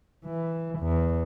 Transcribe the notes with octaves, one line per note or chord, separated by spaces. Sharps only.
E3
E2